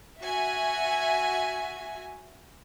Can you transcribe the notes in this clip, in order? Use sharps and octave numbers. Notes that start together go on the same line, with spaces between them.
F#4 E5 G#5